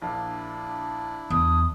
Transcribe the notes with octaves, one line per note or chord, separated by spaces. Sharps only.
A#1 D4 E4 F5
E2 D#6